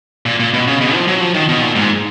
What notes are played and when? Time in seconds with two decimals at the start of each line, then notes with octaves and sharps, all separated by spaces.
0.26 A#2
0.40 A#2
0.54 B2
0.67 C#3
0.81 B2
0.94 F3
1.08 F#3
1.21 F3
1.34 D#3
1.49 B2
1.62 A#2
1.75 G#2